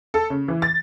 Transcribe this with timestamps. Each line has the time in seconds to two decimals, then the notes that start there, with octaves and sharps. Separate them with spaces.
0.14 A4
0.30 C#3
0.48 E3
0.62 A6